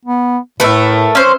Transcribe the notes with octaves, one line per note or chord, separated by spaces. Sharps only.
B3
A2 A3 A#4 B4 E5
C#4 C5